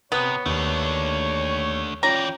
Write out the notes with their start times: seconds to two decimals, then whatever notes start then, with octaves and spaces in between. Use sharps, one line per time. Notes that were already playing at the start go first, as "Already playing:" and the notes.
0.12 C3 B3 C#5 B5 D#6
0.46 D#2 A3 D4 C#5
2.03 E3 C#4 F4 D5 G5 A#5